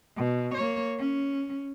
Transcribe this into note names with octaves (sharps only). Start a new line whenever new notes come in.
B2
A#3 C#5
C#4